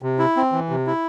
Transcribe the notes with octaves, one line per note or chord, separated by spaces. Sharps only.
C3
E4
C4
E3
C3
E4